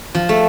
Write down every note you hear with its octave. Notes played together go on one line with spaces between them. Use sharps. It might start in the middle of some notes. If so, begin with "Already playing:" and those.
F3
A3